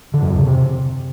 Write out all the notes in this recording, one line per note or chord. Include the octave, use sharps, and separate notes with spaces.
D3
F#2
E2
C#3
C3